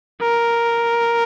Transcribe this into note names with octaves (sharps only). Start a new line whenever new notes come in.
A#4